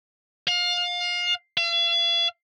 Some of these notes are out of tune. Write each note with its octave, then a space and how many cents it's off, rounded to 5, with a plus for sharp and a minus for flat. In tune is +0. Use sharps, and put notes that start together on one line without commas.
F5 +25
F5 -45